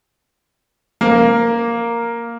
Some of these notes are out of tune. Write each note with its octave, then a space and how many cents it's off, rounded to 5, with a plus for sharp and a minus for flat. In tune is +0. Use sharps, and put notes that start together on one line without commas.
A#3 +0 A#4 +0